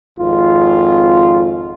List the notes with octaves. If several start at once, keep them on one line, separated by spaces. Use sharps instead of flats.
G#1 F2 F4